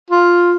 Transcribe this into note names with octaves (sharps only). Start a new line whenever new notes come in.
F4